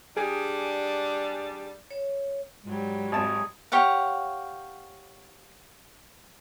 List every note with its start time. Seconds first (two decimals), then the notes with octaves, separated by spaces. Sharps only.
0.17 G3 D4 G#4
1.91 C#5
2.64 G#2 F#3 G3
3.12 G#1 G#4 A5
3.72 G4 C#5 F5 F#5